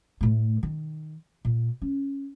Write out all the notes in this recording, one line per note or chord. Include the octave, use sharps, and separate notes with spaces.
A2 A3
D#3
A#2
C#4